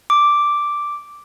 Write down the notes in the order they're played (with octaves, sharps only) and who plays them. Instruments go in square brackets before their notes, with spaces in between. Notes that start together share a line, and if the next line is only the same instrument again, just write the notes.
[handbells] D6